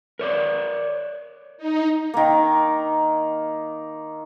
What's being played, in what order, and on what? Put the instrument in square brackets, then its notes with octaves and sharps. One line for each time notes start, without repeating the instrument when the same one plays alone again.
[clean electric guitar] A#4 C#5 D5
[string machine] D#4
[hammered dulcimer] D#3 A#3